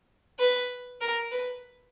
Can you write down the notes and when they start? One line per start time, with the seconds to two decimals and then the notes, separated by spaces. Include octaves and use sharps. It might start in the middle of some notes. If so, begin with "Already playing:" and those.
0.39 B4
1.01 A#4
1.31 B4